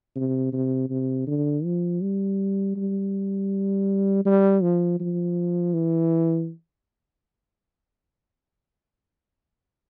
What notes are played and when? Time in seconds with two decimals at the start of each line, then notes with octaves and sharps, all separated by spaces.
0.16 C3
0.53 C3
0.90 C3
1.27 D3
1.64 F3
2.02 G3
2.76 G3
4.25 G3
4.62 F3
5.00 F3
5.74 E3